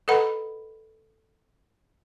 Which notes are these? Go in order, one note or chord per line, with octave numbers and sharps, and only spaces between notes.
A4 B4 D#5 F#5 A#5 B5